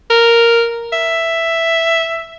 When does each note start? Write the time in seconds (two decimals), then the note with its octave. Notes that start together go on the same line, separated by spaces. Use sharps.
0.10 A#4
0.92 E5